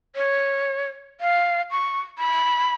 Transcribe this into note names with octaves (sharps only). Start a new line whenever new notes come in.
C#5
F5
C#6
B5